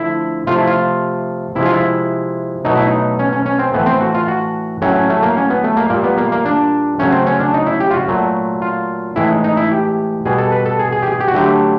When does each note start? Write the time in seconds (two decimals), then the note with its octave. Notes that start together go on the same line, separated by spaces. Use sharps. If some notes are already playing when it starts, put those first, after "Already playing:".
Already playing: D3 F3 A3 E4
0.47 C3 F3 A3 F4
0.58 E4
0.67 F4
1.55 C3 F3 G#3 E4
1.65 F4
1.73 E4
2.65 B2 F#3 A3 D#4
2.75 E4
2.87 D#4
3.19 C#4
3.33 C#4
3.46 C#4
3.59 C4
3.74 A2 E3 A3 B3
3.86 C4
4.01 F#4
4.14 F4
4.28 F#4
4.82 A2 F#3 A3 C#4
4.95 C#4
5.10 A3
5.23 A#3
5.37 C#4
5.50 B3
5.64 A3
5.77 A#3
5.90 A#2 G3 A#3
6.04 B3
6.18 A#3
6.32 A#3
6.45 D4
6.99 C#3 F#3 A3 C#4
7.12 C4
7.26 C#4
7.40 D4
7.54 D#4
7.67 E4
7.80 G4
7.91 F4
7.94 F#4
8.08 A#2 F#3 A3
8.62 F4
9.16 A2 E3 G#3 E4
9.31 D#4
9.44 D#4
9.57 E4
9.71 G4
10.26 B2 G3 G#4
10.38 A4
10.52 B4
10.66 A4
10.79 G#4
10.92 G#4
11.02 G4
11.06 G#4
11.20 G4
11.28 F#4
11.33 D3 F#3 A3 G4